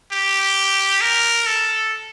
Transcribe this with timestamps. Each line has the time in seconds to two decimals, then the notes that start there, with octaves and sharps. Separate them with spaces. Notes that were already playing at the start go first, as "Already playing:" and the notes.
0.12 G4
1.01 A#4
1.46 A4